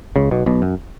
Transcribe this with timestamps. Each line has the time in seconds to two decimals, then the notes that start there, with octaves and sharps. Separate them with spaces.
0.16 C#2 C#3
0.31 B1 B2
0.46 B1 B2
0.62 F#2